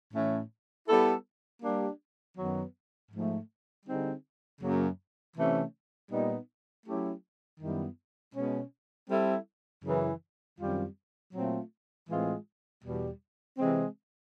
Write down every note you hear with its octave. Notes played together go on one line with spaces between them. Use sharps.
A2 E3 A3 C#4
G3 B3 E4 A4
G3 A#3 D4 G4
F#2 D#3 F#3 B3
G#2 F3 A3
D3 G3 C4 D#4 G#4
F#2 C#3 F#3 A#3
C3 E3 A3 C#4
A#2 G3 B3 D#4
F#3 A3 C#4 E4 G4
F#2 D#3 G3 B3 E4
B2 G#3 C#4
G3 C4 E4 A4
F#2 C#3 E3
F#2 D#3 G3 C4 F4
A#2 F#3 A3 C4 F4
A2 E3 G#3 C4 F4
E2 B2 G3
C3 E3 G#3 C4